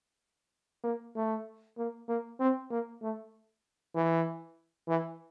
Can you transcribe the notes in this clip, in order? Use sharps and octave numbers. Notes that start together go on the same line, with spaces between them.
A#3
A3
A#3
A#3
C4
A#3
A3
E3
E3